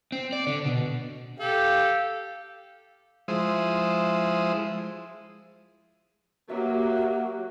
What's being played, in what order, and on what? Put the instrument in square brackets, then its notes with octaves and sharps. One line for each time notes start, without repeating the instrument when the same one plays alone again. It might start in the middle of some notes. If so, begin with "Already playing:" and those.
[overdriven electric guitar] C4
D5
D3
B2
[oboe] G4 [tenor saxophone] A4 [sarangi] F5
[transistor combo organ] F3 G#3 E4 C5 D#6
[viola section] F#3 A#3 G4 [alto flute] F#4 [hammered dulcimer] E5